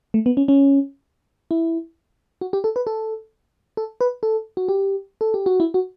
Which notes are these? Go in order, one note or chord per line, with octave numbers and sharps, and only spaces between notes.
A3
B3
C#4
C#4
E4
F#4
G4
A4
B4
A4
A4
B4
A4
F#4
G4
A4
G4
F#4
E4
F#4